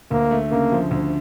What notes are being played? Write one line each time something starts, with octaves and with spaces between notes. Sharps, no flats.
D2 A#3
A3
C#3 A#3
F3
D2